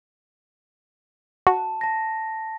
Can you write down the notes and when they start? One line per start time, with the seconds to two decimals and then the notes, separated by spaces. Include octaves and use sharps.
1.47 F#4 A5
1.81 A5 A#6